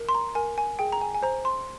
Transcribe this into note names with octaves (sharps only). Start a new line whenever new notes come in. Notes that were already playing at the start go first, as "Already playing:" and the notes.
Already playing: A#4
C6
A#5
A#4 G#5
G#5
G#4 G5
A#5
G#5
G#5
C5 A#5
C6